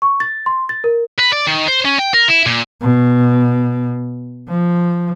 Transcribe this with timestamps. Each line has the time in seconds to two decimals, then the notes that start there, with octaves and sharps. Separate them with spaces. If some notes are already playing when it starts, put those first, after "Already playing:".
0.02 C#6
0.20 A6
0.46 C6
0.69 A6
0.84 A#4
1.19 B4
1.33 D5
1.47 D#3
1.68 C5
1.85 C#4
1.99 G5
2.14 A#4
2.28 E4
2.46 A#2
2.81 B2
4.48 F3